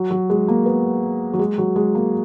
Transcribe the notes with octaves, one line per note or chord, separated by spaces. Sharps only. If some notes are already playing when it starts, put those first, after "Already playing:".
Already playing: F#3
F#3
G#3
A#3
B3
F#3
G#3
F#3
G#3
A#3